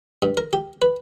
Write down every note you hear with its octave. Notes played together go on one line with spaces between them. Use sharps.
G2
A#4
G4
B4